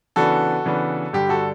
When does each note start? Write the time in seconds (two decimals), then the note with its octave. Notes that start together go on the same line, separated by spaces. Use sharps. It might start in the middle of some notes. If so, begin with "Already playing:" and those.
0.16 C#3 E3 B3 D4 F#4 A4
0.65 C#3 E3 B3 D4
1.13 G2 D3 G3 G4
1.29 F#4 A4